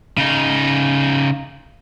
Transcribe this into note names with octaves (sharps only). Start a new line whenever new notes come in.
C#3 D#4